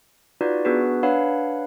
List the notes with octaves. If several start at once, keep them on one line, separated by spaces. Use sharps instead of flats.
D#4 F4 F#4 B4 D5
B3 D4 F#4 G#4 B4
D4 B4 C#5 F5 F#5 B5